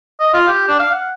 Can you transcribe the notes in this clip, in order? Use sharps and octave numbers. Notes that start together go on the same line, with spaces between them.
D#5
F4
G4
D4
F5
F#5